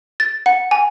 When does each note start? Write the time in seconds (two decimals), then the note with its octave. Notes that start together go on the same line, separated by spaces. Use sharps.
0.20 A6
0.46 F#5
0.71 G#5